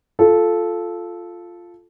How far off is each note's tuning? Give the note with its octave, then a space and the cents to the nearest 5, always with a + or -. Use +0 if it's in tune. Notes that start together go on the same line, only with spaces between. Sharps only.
F4 +0 A4 -10